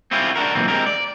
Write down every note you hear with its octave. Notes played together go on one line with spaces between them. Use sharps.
C4 C#4 E4 F4 G4
D4 F#4 A#4
B1 A#2 E3 C4
G#3 C4 G4 A#4
D5